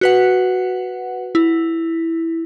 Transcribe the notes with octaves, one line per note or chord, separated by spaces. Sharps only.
F#4 B4 F#5
E4